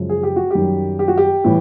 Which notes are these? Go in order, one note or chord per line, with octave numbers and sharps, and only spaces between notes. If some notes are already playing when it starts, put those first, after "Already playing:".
Already playing: F#2 C#3 F3 G#3
G#4
G4
F#4
F#2 D#3 G3 G4
G4
F#4
G4
A2 E3 G3